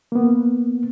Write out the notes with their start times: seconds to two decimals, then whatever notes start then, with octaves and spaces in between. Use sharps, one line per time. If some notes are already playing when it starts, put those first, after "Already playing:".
0.12 A#3 B3